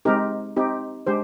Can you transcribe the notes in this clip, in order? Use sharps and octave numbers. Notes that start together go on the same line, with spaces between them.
G#3 C4 D#4 G4 A#4
C4 D#4 G4
G#3 D4 G4 C5